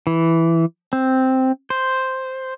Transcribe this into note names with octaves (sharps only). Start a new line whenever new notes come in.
E3
C4
C5